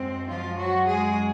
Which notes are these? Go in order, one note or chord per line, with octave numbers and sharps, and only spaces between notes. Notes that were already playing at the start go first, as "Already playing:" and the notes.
Already playing: F#2 G#3 C4
F3 F4
F#3 F#4
G#3 G#4